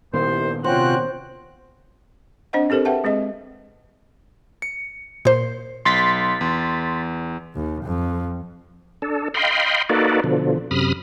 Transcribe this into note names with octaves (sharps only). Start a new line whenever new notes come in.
C2 A#2 D#3 B3 C5
C3 C#4 F4 F#4 C5 G5 F#6
C4 D4 C5 D#5 F#5
C4 G4 A4 A#4 C5
G#4 B4 E5 F#5 G5 A5
G#3 C4 G#4 D#5
C#7
A#2 C5
B1 C6 A6 B6
E2
D#2
F2
D4 A4
D#5 F5 G5 B5 C6
A#3 D#4 F#4 A4 B4 D5
B2 D3 F3
F#2 C3 B5 D#6 F6